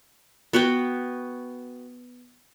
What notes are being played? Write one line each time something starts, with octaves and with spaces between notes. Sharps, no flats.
B3 F#4 B4 G5